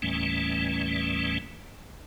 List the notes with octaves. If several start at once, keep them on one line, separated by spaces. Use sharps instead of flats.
D#2 A2 E3 G3 A3 C#4